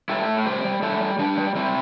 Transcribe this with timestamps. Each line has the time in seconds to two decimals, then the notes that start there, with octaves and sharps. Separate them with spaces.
0.09 G3 E4 A4
0.28 A2
0.46 G3 G4 C5
0.64 G3
0.83 G3 E4 A4
1.00 G3
1.19 G3 D4 G4
1.37 G3
1.55 G3 C4 E4